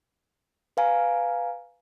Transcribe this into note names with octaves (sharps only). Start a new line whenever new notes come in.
B4 F5 G#5 A#5